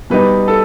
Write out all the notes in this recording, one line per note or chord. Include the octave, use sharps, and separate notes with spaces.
B2 G3 B3 D#4 B4
A4